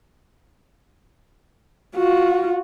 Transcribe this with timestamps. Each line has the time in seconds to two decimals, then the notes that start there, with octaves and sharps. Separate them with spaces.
1.96 F4 F#4